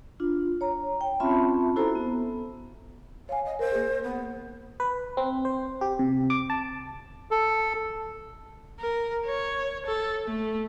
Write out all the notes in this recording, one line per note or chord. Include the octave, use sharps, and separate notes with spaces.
D4 F4
C#5 A#5
G5
C4 C#4 F4 E5 A5 B5
E4 F#4 A4 C5 A#5
B3
C#5 F5 G#5
D#5
A#4 C5
A#3 G#4
B3
B4
C4
C5
G4
C3
D6
A5
A4
A#4
C#5
A4
A3